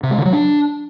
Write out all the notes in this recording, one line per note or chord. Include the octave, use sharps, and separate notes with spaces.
C3
G#3
D3
F#3
D4